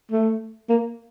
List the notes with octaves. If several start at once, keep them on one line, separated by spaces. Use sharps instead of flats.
A3
A#3